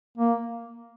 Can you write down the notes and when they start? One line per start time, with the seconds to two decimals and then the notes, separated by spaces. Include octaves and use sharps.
0.17 A#3